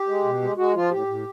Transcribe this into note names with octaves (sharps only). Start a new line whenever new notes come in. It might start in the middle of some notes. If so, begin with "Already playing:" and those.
Already playing: G4
G#3
B2
G#3
G#3 F#4
F3 F4
A2 G4
A2